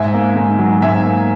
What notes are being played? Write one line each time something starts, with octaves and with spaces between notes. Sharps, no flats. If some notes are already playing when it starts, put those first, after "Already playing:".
Already playing: G#2 E5 G#5
A#3
G#2
F#3
G#2 E5 G#5
A#3